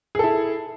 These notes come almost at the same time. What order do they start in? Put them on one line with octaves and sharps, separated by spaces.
G#4 A4 E4